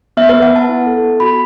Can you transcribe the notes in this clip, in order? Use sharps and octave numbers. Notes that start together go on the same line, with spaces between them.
B3 E5
B3 B4
F#5
B3 A5
E4
A4
B3
F#4 B5